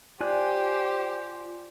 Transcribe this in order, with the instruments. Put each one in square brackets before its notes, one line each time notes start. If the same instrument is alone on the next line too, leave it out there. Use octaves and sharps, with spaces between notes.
[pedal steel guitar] F4 G#5 F#6 [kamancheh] G4 [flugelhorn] C5 [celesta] D5 D6